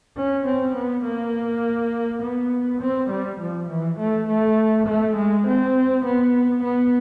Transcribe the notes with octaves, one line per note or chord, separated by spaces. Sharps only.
C#4
C4
B3
A#3
B3
C4
G3
F3
E3
A3
A3
A3
G#3
C4
B3
B3